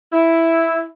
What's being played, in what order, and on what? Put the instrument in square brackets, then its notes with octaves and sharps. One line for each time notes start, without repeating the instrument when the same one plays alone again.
[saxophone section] E4